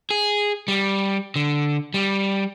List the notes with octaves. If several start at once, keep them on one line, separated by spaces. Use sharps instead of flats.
G#4
G3
D3
G3